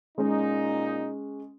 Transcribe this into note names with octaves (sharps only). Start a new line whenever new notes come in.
A#2 G#3 C#4 D#4